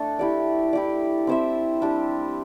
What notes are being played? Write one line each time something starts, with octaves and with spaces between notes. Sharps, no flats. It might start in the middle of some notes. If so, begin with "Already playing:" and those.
Already playing: A3 D4 A4
E4 G4 D5
E4 G4 D5
C4 E4 C5 E5
G3 D4 G4 E5